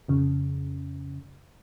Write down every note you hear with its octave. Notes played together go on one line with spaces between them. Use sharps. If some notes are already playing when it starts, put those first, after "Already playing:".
F2 C#3